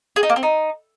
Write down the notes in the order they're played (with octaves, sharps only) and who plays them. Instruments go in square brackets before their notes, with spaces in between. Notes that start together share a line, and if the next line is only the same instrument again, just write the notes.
[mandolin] G#4
D#4
A#3
C4
D#4